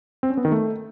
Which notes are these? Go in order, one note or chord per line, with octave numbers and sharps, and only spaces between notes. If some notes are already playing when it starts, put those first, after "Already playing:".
C4
C#4
B3
D#3
A3